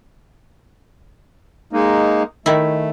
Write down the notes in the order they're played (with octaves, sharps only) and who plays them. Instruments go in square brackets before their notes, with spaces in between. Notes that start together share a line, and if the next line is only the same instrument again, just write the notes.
[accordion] G#3 A#3 D#4
[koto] D#3 E4 [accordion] A3